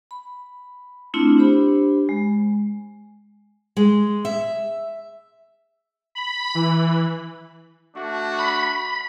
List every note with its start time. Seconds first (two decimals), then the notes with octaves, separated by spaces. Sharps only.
0.11 B5
1.14 A3 C4 D4 E4 F4
1.37 D4 G4 C5 B5
2.09 G#3
3.77 G#3
4.25 E5
6.15 B5
6.55 E3
7.95 A3 D4 F#4
8.39 B5